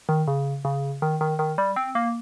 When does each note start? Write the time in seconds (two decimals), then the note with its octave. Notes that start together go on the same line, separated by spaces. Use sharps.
0.09 D#3
0.28 C#3
0.65 C#3
1.02 D#3
1.21 D#3
1.39 D#3
1.58 G3
1.76 C4
1.95 A#3